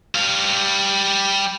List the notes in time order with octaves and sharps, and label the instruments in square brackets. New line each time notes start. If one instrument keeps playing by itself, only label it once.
[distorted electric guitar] G3 F5